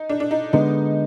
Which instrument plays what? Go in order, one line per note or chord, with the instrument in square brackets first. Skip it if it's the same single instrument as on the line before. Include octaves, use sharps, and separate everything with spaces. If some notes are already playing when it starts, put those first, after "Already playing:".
Already playing: [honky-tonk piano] D#4
D4
D4
D#4
[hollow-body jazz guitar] D3 G#3 B3 [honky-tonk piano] D#4